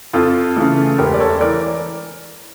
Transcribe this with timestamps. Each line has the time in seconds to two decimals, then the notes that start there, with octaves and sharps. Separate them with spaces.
0.13 F2 F4 A4
0.56 C#3 E3 A3
0.98 E1 G4 A#4
1.14 D5
1.20 A4 C#5
1.41 E3 A#4 D5